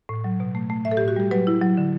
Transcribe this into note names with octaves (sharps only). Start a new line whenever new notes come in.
A2
F#3
B2
A3
A3
A2 E5
A4
A2 G4
F#4
G3 G4
F#3 B4
E4
F#3
D3